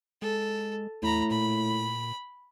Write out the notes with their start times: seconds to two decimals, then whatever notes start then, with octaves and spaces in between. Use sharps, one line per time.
0.22 G#3 A4
1.03 E2 A2 A#5 B5
1.31 A#2 B5